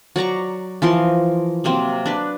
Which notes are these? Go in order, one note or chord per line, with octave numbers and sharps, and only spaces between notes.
F#3 D5 A#5 C#6
E3 F3 A#4 C6
C3 F#3 A#3 C4
D4 B4